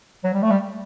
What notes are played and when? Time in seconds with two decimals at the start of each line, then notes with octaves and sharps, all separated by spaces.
0.24 F#3
0.34 G3
0.43 A3
0.51 G3